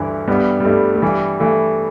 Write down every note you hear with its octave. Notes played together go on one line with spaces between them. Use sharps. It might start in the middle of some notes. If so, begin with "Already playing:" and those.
Already playing: D2 G2 D3 E3
G2 G3 B3
G3
G2 A3
A3
E3 G3
E3 A3